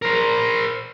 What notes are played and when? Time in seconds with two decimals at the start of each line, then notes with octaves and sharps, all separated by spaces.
0.02 A#4 C5